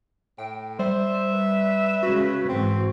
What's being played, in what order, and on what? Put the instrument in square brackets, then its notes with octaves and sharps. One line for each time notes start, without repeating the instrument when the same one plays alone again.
[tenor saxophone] A2 [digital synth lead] G5
[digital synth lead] G3 [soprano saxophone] C5 [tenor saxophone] E5
[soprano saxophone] B4
[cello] C#3 G#3 [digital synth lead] F#4
[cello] G#2 E3 [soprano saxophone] C4